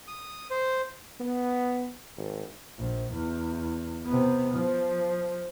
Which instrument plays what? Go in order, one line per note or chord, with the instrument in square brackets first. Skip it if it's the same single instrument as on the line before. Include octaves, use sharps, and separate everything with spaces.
[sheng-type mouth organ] D#6
C5
[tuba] B3
G#1
[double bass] A#1
E2
C3 B3
F3